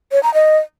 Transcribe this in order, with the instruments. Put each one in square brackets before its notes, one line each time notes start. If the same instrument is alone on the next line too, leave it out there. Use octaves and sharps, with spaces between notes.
[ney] C#5
A#5
D#5